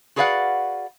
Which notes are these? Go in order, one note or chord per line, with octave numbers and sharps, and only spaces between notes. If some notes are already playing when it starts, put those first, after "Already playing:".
F#4 G#4 B4 D5 F5 F#5